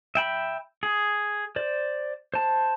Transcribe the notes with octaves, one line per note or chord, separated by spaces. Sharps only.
E5 G5 B5
G#4
C5 D5
C5 A5